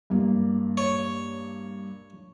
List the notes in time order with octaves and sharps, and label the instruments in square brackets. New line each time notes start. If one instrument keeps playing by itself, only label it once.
[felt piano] G2 A#3
[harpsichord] C#5